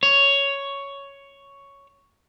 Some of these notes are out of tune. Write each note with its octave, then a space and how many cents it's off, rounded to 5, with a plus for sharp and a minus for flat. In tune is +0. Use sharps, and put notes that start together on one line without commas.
C#5 +5